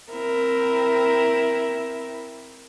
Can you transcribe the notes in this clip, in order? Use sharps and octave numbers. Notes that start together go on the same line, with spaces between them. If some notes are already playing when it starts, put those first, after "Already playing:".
C4 E4 A#4